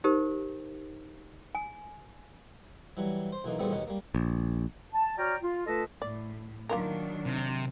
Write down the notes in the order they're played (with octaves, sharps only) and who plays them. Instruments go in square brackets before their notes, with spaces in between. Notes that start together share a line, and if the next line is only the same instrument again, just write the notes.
[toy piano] D#4 G4 A#4 C5
G#5
[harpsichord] E3 F#3 G3
C5
B1 E3 A#3 D#4
E2 A#2 G3 A3 B3 C4
D#2 B2 D#3 C#4 D#4
G3 A#3
[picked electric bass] A#1
[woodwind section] A5
F#4 C#5 D5 G5 A#5 F6
F4
A3 F4 A4 B4 D#5 A5
[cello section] A2 [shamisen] D5
[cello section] D#3 F#3 D4 [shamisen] A#3 F4 A#4
[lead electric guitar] C3